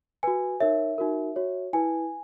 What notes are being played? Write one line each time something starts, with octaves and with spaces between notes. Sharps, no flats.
F#4 B4 G#5
D#4 A#4 C#5 E5
D#4 F#4 A#4
F#4 C#5
E4 B4 G#5